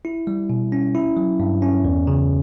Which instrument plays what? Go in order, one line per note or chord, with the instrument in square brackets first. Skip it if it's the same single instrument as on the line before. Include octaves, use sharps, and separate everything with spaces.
[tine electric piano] E4
G3
B2
C#4
E4
F#3
G2
C#4
E2
C#3